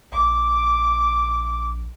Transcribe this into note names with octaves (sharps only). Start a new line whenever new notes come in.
A#1 D6